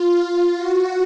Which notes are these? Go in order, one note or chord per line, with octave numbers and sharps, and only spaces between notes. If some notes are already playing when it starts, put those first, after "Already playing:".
Already playing: F4
F4
F#4